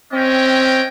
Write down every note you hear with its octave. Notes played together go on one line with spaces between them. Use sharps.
C4 C#4 D#5 G5